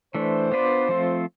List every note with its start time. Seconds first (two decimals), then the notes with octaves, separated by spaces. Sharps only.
0.15 E3 A3 D4 C5
0.52 B3 D4 F4 B4 D5
0.89 F3 A3 C4 F4